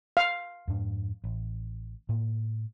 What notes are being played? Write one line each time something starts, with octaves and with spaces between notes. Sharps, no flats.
F5
F2 G#2 D4
A1
A2 A#3